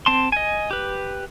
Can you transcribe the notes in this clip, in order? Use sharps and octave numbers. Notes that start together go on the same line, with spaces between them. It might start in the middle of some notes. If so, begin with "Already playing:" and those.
C4 A5 C6
D#5 G#5
G4 B4